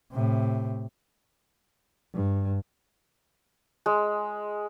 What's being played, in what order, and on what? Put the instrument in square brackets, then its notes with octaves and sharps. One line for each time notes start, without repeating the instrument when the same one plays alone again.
[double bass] A2 C3
G2
[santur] G#3